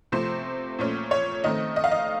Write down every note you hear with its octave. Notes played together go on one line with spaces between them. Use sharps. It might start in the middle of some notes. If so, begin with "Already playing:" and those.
C3 F3 A3 C4 C5
A#2 A3 C#4
C#5
D#3 A3 C4 D#5
D#5
F5
D#5